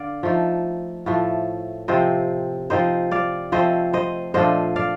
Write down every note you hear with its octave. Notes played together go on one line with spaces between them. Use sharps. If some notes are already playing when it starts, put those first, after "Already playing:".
Already playing: D3 D5 F5
F3 A3 D#4
A2 F3 A3
C3 F3 C4 C5 D#5
F3 C4 D#4 C5 D#5
D5 F5
F3 A3 C4 C5 D#5
C5 D#5
A#2 F3 A3 D4 C5 D#5
D5 F5